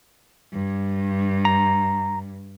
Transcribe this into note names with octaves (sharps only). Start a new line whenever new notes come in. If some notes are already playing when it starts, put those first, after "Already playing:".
G2
A#5